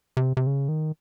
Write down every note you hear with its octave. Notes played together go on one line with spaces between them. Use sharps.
C3
C3
C#3
D#3